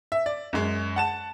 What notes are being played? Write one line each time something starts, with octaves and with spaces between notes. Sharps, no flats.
E5
D5
F#2 G#3
F#5 A5 E7